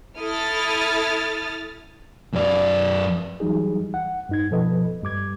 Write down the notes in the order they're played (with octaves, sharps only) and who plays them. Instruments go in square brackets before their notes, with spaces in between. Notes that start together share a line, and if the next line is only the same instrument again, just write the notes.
[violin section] E4 A4 D#6 F6 A6
[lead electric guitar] F#2 D5
[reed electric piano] E3 F#3 G3 D#4 G#4
F#5
G2 D#4 G#6
B2 F3 A4 B4 D#5
G2 G3 D6 G#6